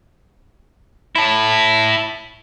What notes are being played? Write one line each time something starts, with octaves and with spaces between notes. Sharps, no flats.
E4 A5